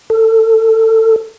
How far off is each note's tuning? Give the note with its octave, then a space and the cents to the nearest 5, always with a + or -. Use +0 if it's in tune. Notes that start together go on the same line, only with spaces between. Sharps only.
A4 +25